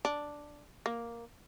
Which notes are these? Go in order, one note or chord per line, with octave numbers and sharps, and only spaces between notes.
D4
A#3